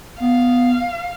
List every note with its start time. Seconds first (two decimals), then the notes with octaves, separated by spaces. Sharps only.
0.20 B3 F5